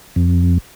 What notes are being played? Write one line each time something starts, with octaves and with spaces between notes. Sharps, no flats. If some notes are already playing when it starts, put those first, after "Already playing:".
F2